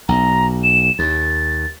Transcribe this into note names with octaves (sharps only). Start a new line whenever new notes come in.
B1 A#5
E7
D#2 A6